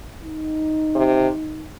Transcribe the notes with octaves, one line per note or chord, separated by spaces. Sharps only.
D#4
C3